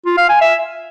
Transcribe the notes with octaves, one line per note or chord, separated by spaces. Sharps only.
F4
F5
G#5
E5